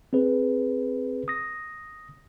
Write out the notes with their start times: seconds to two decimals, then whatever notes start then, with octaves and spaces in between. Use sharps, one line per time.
0.13 C4 G#4 B4
1.28 D#6 A#6